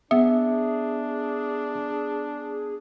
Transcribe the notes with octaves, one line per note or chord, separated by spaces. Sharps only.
B3 D4 G#4 E5